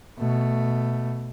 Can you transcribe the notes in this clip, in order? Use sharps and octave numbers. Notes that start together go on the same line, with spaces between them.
B2 A3